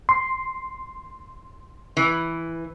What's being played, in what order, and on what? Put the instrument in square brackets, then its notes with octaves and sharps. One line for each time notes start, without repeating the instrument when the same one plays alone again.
[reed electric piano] C6
[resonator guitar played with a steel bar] E3